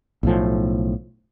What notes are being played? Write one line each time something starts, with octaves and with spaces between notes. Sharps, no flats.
B1 A2 F3